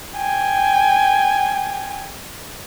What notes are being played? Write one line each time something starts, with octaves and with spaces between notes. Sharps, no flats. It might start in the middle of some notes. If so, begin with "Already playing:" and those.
G5 G#5